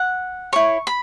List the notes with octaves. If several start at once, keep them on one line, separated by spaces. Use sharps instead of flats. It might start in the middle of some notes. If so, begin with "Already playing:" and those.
Already playing: F#5
E4 C#5 C#6
B5